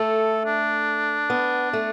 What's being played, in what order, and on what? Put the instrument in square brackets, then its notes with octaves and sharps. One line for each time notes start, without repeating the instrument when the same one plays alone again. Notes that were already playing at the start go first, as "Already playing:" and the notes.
Already playing: [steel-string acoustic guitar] A3 [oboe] A4
[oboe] D4
[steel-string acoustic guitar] B3
A3